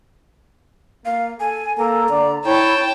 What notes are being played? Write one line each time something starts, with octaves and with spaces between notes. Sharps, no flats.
A#3 F5
A4 G#5
A#3 A4 A#5
D3 D5
E4 C#5 G5 A5